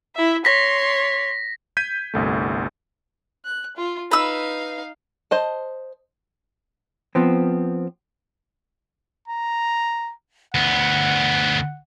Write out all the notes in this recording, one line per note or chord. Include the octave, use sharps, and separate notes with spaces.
E4 E5
C#5 C6 A#6 B6
G6 G#6 B6 D#7
G1 C2 A3
F#6
F4
D#4 B4 F5 E6
C5 D#5 A5
F3 B3 C4
A#5
D2 B3 F#5